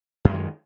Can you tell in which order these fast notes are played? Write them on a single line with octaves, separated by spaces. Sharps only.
F#2 G#3 D#3